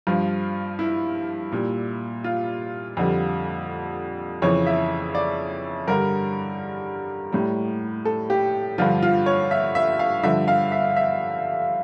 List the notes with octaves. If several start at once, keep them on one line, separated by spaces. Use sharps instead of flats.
G2 F3 F4
E4
A#2 G3
F4
F2 D3 G3
F2 C#3 E3 C#5
E5
D5
G2 D3 G3 A#4
A2 G3
A4
G4
G2 D3 F3 F4
F4
C#5
E5
E5
F5
G2 D3 F3 E5
F5
E5
E5